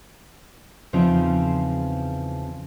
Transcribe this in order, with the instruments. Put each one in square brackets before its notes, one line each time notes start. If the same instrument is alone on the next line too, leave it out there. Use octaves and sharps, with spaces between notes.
[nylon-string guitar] E2 C#3 F3 B3 C4 D#4